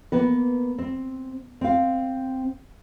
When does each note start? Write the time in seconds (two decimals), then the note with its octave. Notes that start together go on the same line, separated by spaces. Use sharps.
0.12 A#3 B3 B4
0.78 C4
1.61 C4 F5